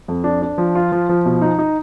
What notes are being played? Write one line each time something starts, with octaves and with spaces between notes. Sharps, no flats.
F2
D4
D4
F3
F4
F3
F3
B2
D#4
D#4